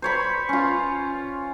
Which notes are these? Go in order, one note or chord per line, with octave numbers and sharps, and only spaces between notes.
C5 C#5 B5
C#4 F4